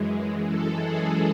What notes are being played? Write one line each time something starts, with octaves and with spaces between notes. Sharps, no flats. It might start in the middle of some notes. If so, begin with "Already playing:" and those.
Already playing: F#2 E3 G#3
A4
G#4